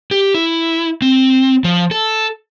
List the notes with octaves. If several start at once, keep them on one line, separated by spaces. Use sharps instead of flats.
G4
E4
C4
F3
A4